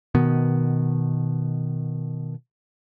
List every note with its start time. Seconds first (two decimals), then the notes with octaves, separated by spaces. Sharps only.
0.15 B2 D#3 B3